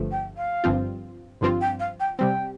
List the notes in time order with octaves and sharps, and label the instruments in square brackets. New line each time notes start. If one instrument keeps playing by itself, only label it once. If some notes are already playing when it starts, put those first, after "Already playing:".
Already playing: [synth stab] G1 G2 D3 F3 A3
[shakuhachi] G5
F5
[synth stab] G1 G2 F3 C4 F4
[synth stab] G1 G2 F3 C4 F4 [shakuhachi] C6
[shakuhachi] G5
F5
G5
[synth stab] C3 G3 C4 [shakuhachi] G5